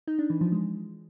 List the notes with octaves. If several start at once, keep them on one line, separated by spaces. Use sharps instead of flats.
D#4
D4
E3
F3
G#3